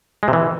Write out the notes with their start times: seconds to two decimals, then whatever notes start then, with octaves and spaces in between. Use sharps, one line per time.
0.23 G#3
0.28 C3
0.33 E3